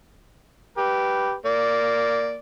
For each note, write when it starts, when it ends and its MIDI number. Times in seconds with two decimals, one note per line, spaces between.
0.78 1.33 67
0.78 1.33 71
1.46 2.39 58
1.46 2.39 74